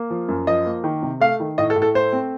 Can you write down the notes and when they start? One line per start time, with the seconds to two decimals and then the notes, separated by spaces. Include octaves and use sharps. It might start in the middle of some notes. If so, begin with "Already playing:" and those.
Already playing: A#3
0.10 F3
0.28 F#2
0.47 F3 D#5
0.66 A#3
0.84 D#3
1.03 C3
1.21 A3 F5
1.40 D#3
1.58 A2 D#5
1.70 A4
1.76 A2
1.82 A4
1.94 A3 C5
2.13 C4